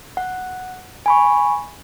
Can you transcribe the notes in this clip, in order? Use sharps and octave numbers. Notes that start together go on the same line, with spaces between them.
F#5
G#5 B5 C#6